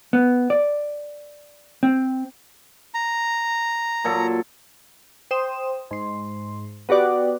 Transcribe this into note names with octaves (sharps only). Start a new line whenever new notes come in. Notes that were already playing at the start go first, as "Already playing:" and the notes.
B3
D5
C4
A#5
A#2 F#3 A4
C5 G5 D#6 E7
G#2 C6
B3 F#4 G4 D5 F#5